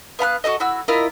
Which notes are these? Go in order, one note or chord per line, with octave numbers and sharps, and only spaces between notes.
B3 F5 B5 F#6
F#4 G#4 A4 D#5
E4 F#4 E6
E4 F4 A#4 D#5